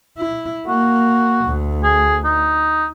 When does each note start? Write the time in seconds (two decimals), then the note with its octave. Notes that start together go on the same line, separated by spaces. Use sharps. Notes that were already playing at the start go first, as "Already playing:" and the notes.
0.18 E4
0.67 A#3 F#4
1.46 D2
1.84 G#4
2.25 D#4